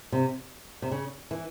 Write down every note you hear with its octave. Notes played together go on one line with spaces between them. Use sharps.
C3
C3
C#3
E3